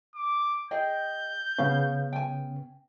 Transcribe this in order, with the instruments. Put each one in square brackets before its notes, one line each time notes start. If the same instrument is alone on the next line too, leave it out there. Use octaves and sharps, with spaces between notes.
[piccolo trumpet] D6
[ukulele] G#4 D#5 G5 [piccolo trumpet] G6
[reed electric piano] C#3 B3 C#4 [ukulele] F5
[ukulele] G5 G#5